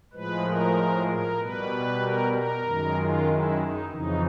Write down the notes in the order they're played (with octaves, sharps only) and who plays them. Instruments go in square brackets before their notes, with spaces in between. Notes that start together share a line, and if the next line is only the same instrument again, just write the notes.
[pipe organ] A2 F3 G#3 B4
A#4
A#4
B2 G3 B4
A#4
A#4
F#2 D#3 G#3
F4
E4
D#4
F2 C#3 E3 D#4